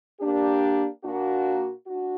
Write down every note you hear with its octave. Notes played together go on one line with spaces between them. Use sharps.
A#3 D4 G4
A#2 A#3 D4 F#4
D4 F#4